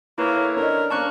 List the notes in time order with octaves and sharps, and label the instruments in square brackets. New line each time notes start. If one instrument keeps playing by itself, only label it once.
[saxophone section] D3 A3 C#5 [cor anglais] A#3 [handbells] E4 B4
[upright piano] C#4 D4 D#5 [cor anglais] A#4
[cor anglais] A#3 [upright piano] C#4 D4 [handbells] A5 C#6 F#6